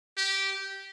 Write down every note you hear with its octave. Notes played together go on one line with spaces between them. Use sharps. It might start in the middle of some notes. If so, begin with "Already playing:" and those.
G4